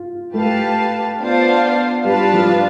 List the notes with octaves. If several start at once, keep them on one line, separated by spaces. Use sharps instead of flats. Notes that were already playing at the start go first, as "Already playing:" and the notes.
Already playing: F4
A3 G4 B4 F5 A5
B3 D4 F4 C5 F5
G3 D4 F4 B4 F5 A5
F3